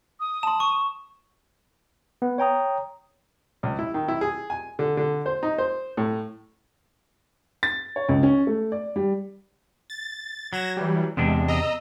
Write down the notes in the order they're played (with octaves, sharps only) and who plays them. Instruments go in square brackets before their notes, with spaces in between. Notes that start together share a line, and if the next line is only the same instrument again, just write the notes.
[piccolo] D#6
[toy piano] A5 C6 [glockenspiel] E7
[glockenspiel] C#6
[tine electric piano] B3
C#5 G5 A#5 D#6
[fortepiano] C#2
E4
D#3
E4
G#4
G#5
D3
D3
C5
D#4
C5
A2
[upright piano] A6
C#5
C#2
C#4
A3
D5
G3
[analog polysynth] A6
[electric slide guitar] F#3 [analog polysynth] G#6 A#6 E7
[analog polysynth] E3 G3
[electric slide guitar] E2 C3 D4 [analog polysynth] G#3
[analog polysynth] D#5 A#5 E6